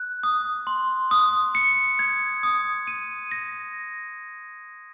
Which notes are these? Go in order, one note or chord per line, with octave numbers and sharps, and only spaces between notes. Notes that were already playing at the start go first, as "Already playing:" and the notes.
Already playing: F#6
D#6
C6
D#6
C#7
G#6
D#6
D#7
A#6